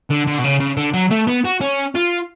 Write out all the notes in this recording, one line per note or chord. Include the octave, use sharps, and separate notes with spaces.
D3
D3
B2
C#3
C#3
D3
F#3
A3
B3
F#4
C#4
F4